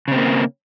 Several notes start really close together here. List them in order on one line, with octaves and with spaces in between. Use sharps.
C#3 C4 A#3